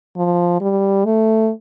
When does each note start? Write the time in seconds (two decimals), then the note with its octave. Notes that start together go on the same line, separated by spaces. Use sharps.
0.17 F3
0.61 G3
1.05 A3